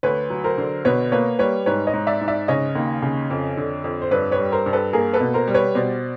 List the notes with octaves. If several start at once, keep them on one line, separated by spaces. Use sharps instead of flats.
D2 B4 C#5
F#3
A#4 C5
D3
B2 B4 C#5
A#3 B4 C#5
G3 B4 C#5
G#2 B4 C#5
C#5 D#5
G#2
D5 E5
G#2
D5 E5
C#3 C#5 D#5
D#2
C#3
F2
D3
F2
C5
G2 B4 C#5
B4 C#5
G3
A#4 C5
G2
A4 B4
A#3 G#4 A#4
A4 B4
B2
A#4 C5
G3
B4 C#5
B2 C5 D5